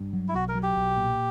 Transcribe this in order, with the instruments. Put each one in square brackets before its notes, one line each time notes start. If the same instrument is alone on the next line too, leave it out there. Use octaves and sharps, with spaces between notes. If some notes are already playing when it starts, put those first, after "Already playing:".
Already playing: [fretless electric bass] G2
F#3
[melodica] E4
[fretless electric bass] B1 [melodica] F#4
[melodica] A#4
[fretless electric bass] F#3
[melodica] G4
[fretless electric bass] B1
A#2